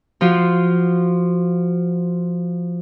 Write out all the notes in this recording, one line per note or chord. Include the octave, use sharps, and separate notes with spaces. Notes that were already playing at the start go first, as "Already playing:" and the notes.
F3 F4 F#4